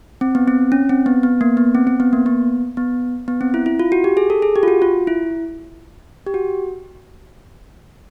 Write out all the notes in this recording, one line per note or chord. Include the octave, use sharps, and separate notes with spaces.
C4
B3
C4
C#4
C4
B3
B3
A#3
B3
C4
C4
B3
A#3
B3
B3
B3
C4
E4
E4
F4
F#4
G4
G#4
A4
G#4
G4
F4
F#4
F4
E4
G4
F#4